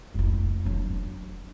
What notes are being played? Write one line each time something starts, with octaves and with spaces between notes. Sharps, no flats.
F1 E4
F#3 D4